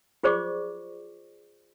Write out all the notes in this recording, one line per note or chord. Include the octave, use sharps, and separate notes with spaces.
F4 G#4 C5 D5 C#6 D6